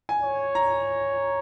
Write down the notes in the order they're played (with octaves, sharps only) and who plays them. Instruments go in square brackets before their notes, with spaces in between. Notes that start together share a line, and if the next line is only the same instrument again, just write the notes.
[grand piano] G#5
[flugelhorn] C#5
[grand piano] A#5